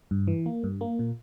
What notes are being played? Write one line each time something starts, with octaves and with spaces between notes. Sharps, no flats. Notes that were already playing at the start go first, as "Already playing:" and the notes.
G2
E3
A#3
G2
A#3
A#2